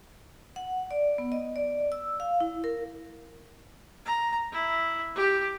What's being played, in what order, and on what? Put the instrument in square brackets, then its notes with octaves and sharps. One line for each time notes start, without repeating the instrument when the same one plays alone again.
[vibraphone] F#5
D5
B3
D#5
D5
E6
F5
E4
A#4
[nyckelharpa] A#5
E4
G4